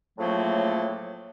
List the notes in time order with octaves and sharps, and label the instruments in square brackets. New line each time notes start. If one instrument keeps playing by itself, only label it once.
[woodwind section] A2 C#3 F3 F#3 A3 A#3